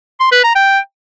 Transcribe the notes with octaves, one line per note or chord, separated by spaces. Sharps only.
C6
B4
A#5
G5